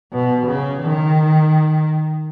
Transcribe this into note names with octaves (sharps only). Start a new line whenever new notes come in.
B2
C#3
D#3